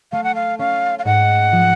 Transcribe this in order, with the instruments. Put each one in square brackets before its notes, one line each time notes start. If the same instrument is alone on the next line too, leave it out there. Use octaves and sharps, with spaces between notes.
[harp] A3 [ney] F5
[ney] F#5
F5
[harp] C#4 [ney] F5
[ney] F5
[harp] G#2 [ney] F#5
[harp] F3